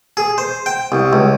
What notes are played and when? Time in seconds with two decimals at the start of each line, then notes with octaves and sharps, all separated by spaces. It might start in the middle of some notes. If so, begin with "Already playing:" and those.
0.17 G#4
0.38 C5
0.66 G5
0.92 C2
1.13 C#2